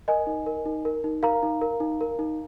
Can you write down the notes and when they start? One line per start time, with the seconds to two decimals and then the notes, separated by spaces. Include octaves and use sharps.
0.08 A#4 D#5 G#5
0.27 D#4
0.46 A#4
0.65 D#4
0.85 A#4
1.04 D#4
1.23 A#4 F5 A#5
1.43 D#4
1.61 A#4
1.80 D#4
2.01 A#4
2.19 D#4